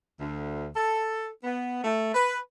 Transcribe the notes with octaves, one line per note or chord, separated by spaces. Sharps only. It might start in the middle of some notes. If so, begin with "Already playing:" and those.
D2
A4
B3
A3
B4